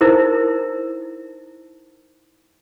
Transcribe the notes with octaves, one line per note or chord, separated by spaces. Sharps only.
D#4 E4 A#4 C5